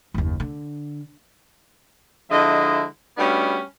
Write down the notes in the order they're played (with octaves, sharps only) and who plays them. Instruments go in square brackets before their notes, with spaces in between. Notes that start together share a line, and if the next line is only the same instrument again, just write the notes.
[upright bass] F#1 D#2
D3
[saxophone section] D3 F3 G#3 E4 D#5 E5
G3 A3 B3 C#4 D4 F#4